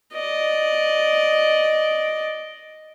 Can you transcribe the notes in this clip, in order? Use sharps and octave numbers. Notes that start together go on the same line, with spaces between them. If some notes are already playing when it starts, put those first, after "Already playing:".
D5 D#5